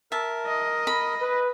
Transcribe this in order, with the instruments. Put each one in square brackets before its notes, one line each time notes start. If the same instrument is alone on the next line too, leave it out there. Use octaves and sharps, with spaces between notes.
[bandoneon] A#4 [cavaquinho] E5 A5
[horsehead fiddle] D#5
[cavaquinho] B5
[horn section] B4